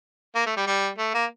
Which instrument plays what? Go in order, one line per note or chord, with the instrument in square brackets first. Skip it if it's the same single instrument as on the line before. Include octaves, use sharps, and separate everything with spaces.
[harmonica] A#3
A3
G3
G3
A3
A#3